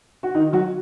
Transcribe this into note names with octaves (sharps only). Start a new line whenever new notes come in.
F#4
D#3 D#4
F#3 F#4